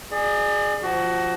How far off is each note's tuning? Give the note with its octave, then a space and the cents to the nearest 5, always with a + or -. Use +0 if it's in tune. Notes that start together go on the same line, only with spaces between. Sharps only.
G#4 +0 D5 +35
F3 +0 F#4 +20